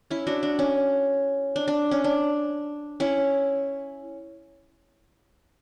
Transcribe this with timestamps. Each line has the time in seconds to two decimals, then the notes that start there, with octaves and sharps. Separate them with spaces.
0.11 C#4 E4
0.27 D4 F#4
0.43 D4
0.59 C#4
1.56 D4
1.68 D4
1.91 C#4
2.04 D4
3.00 C#4 E4